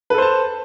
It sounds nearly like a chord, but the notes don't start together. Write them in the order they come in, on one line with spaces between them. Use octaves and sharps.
B4 A4 C5 A5